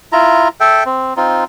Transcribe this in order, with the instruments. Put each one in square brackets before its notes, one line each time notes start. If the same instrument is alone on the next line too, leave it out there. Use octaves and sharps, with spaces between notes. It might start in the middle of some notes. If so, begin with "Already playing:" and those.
[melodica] E4 F4 A#5
A4 E5 G5
C4
C4 D#4 F4